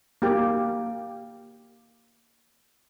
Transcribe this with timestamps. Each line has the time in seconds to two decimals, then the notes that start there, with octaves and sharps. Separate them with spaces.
0.22 A#3 G4